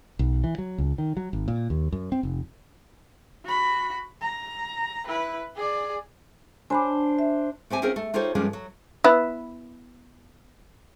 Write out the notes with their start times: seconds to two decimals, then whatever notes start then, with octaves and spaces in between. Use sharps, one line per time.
0.19 B1
0.44 E3
0.58 F#3
0.78 C#2
0.98 D#3
1.17 F#3
1.33 G#1
1.48 A#2
1.70 D#2
1.92 F#2
2.12 C4
2.23 F1
3.44 F#4 B5
4.21 A#5
5.07 E4 B4
5.56 G#4 D5
6.70 D4 C5 G#5 B5 D6
7.19 E5
7.70 A3 C4 G4 G#5
7.82 C4 C#4 F4 G#4 A#4 C5
7.96 A3
8.14 D#4 F4 G4 A4 C5 C#5
8.35 G2 F3 G3 G#3 A#3 C#4
8.53 F#3
9.04 B3 E4